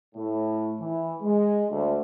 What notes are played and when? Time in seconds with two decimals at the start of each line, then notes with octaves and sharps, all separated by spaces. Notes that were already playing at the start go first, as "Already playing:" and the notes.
0.15 A2
0.81 E3
1.22 G#3
1.71 D2